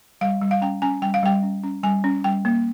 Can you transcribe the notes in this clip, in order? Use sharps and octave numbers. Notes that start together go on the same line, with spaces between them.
G3 F5
G3
F5
C#4 G5
C#4 G#5
G3 G5
F5
G3 G5
C#4
C#4
G3 G#5
C#4
G3 G5
A#3